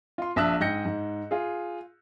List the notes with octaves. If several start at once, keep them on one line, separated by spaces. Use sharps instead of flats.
F4 C6
A#1 E5 A5 D#6 E6 F#6
G#2 D#5 G5 G6 A#6 C#7
G#2
F4 G#4